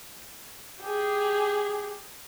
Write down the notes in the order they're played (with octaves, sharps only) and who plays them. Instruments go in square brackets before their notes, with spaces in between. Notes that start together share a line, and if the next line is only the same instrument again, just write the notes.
[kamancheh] G4 G#4